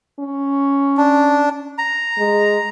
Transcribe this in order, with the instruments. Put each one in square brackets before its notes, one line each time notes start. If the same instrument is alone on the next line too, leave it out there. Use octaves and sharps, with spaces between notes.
[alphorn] C#4
[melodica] D4
A#5
[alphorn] G#3